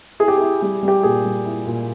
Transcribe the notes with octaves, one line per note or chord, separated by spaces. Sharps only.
E4 G#4
G4
E4 G#4
G3 G4
G3
G4
A#2 G#4
G3
E4
A#2